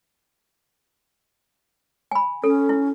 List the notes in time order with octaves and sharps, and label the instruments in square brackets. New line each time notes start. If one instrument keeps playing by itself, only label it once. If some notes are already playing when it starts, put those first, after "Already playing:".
[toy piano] G#5 B5
[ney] C#4 [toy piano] A4
[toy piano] E4